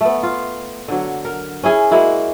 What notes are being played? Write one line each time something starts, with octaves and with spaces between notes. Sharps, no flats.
A3 B3
F4
D3 F#3
A#4
C#4 E4 G#4
G#3 A#3 E4 F#4